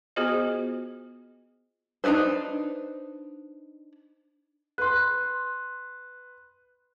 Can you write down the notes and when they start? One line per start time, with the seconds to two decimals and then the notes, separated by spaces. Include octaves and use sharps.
0.16 B3 F4 F#4 G#4 C5 D#5
2.04 D4 D#4 F#4 B4 C5
4.78 B4 C6 F#6